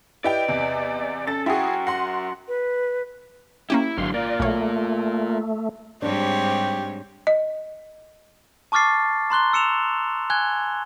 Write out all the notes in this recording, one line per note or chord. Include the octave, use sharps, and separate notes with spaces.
E4 G4 B4 D5 D#5 G5
E2 C3
C#4 A4 A6
F#2 F#3 E4 G#4 F#5 G5 C6
F#5 C6 A#6
B4
A#3 C#4 E4 G4
G#1 D3 F#3 F5 C6
A#3 F4 D5
B1 A3 C#5
G#2 G3 C4 D4 G4 C#5
D#5
A5 C#6 D6 F6 A6 C7
A#5 C6 F#6 G7
E6 C#7 E7 F7
G#5 F#6 G#6 G7